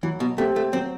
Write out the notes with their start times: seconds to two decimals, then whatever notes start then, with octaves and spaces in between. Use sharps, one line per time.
0.03 E3 F#3
0.20 B2
0.38 A3 C4 G4
0.56 A3
0.73 F#3 C4